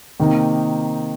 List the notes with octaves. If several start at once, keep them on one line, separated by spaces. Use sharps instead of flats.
C3 D#3 A#3 D#4